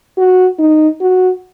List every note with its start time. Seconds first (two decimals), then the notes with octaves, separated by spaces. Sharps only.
0.18 F#4
0.59 D#4
1.01 F#4